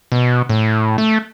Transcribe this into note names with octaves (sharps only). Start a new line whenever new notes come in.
B2
A2
A3